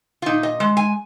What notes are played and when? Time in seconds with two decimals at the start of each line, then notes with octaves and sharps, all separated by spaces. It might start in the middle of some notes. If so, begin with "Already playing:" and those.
0.22 F4
0.26 A#2 D#4
0.43 D#5
0.60 G#3
0.77 G#5